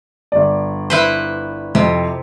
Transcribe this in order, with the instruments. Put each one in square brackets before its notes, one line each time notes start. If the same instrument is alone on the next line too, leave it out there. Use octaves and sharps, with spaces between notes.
[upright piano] G1 D5
[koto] E4 B4 C5
[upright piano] F2 [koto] C3